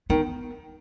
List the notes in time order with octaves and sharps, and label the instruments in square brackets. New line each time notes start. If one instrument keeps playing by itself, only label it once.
[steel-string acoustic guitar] D#3 [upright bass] B3